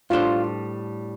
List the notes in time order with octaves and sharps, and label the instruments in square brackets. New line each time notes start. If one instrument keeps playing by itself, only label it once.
[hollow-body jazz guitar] A2 G3 D4 A4 C5 [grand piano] F4